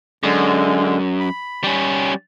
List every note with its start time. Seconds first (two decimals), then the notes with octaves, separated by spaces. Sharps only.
0.23 F#2 D3 G#3
1.20 B5
1.64 G3 C#4